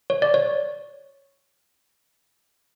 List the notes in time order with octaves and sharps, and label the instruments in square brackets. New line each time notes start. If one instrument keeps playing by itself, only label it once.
[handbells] C#5
D5
C#5